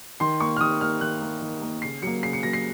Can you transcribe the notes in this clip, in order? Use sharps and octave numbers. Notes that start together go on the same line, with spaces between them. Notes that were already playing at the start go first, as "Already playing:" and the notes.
D#3 C6
A#3 C#6
F6
D#3 D#6
A#3 F6
D#3 F#6
A#3
D#3
A#3
C#3 C7
F#3 A#3 C#7
C#3 C7
C#7
F#3 A#3 A#6
C7